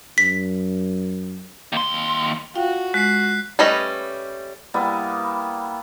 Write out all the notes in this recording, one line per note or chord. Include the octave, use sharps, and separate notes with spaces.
F#2 B6
D#2 C6
F4 F#4 F5 G5
G#3 F#6 B6 C7
G3 A3 C#4 B4 D#5
G3 A#3 B3 E4